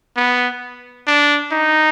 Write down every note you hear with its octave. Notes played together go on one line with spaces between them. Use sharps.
B3
D4
D#4